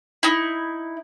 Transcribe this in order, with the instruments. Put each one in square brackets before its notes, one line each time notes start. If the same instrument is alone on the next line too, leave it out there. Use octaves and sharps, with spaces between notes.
[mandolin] D#4 E4